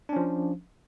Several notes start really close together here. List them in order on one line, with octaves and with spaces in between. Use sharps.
D4 C#4 F3